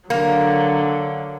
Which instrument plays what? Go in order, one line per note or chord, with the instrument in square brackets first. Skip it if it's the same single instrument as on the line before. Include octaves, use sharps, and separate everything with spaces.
[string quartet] D3 F#3 [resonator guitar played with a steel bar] A#3